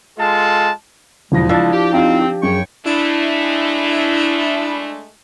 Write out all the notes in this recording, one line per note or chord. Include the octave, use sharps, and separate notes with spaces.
G#3 F4 A4 A5
E1 C#3 F3 G#3 E4 A#6
F3 D4 E6 A6
G4
C4 D#4 F4 G4
G4
F#2 G#4 C#5 G5 C#6
G#3 A3 D4 E4